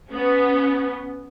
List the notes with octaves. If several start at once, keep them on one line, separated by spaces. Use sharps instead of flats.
B3 C#4